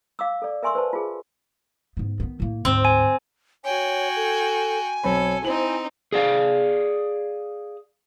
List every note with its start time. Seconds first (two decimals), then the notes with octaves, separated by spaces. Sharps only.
0.19 F5 D6 E6
0.42 A4 D5
0.63 A#4 E5 G#5 C6 C#6 E6
0.75 B4 C5 A5
0.93 F4 G#4
1.97 G#2 B3
2.20 D#3 B3
2.40 A2 A#3
2.65 D2 G#2 C4
2.85 G#5
3.64 F#4 C#5 G5 G#5
4.16 A4
5.04 B1 C4 A4 C#5 B5
5.44 C4 D#4 E4 C5 F#7
6.13 G#4 D5 F5